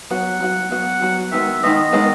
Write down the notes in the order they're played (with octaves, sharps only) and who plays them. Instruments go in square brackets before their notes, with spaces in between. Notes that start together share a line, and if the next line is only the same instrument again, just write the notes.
[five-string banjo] F#3 B3 F#4 [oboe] F#5
[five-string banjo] F#3 B3 F#4
[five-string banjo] F#3 B3 F#4 [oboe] F#5
[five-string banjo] F#3 B3 F#4
[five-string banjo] D#3 G#3 B3 [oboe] E5
[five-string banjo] D#3 G#3 B3 [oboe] D#5
[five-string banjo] D#3 G#3 B3